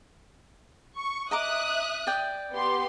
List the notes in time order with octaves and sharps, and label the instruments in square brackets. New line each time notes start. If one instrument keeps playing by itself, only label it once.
[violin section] C#6
[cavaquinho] D#5 A#5 D6 [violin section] E5 D#6 F#6
[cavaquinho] D5 G5
[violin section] B3 G4 C6